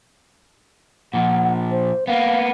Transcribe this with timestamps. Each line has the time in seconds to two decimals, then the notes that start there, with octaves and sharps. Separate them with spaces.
1.14 A#2 F3 F#5
1.71 C5
2.07 A#3 B3 F5